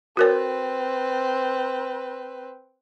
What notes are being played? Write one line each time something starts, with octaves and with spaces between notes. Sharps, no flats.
C4 F#4 A#4 B4 C#5